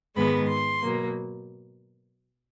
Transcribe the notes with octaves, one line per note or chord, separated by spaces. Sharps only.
G#2 D#3 G#3 B3 B5
C6
B2 F#3 A#3